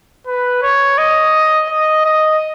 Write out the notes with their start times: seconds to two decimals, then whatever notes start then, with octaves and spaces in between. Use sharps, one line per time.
0.27 B4
0.63 C#5
0.98 D#5
1.69 D#5
2.05 D#5